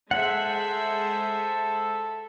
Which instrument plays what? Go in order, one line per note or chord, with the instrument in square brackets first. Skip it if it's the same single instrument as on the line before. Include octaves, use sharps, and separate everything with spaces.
[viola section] G#3 C5 E5 [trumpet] A4 [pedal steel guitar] F#5